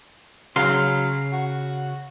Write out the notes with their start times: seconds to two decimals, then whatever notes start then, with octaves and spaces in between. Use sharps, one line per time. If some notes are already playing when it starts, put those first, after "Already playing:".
0.56 C#3 F#3 F5 C6
1.32 F#4